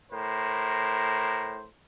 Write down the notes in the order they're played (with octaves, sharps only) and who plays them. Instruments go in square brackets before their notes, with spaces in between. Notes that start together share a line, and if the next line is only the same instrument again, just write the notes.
[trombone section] A2 A#4 C5